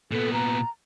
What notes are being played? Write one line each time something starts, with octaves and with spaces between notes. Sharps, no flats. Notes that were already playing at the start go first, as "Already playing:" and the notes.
A#2 B3 A4
A#5